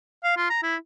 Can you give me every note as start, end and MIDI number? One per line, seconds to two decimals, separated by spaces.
0.24 0.37 77
0.37 0.47 65
0.50 0.62 82
0.63 0.76 64